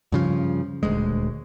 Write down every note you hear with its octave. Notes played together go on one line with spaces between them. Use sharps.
G2 C#3 F3
D#1 D2 G#3